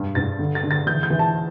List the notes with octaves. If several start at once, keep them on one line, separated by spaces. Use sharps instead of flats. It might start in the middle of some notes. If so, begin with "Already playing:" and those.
Already playing: G2 D4
G2 A6
D3
A6
D3
A6
E3 G6
G6
E3
A5